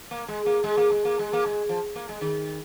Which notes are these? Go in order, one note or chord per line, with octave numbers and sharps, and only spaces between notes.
A#3
G#3
A#3
G#3
A#3
G#3
A#3
G#3
A#3
G#3
F3
A#3
G#3
D#3